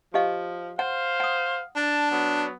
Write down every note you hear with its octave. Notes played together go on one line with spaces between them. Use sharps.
F3 G4 D#5 F5
C5 F5 F#5
F#5 D#6
D4 A5
F#3 B3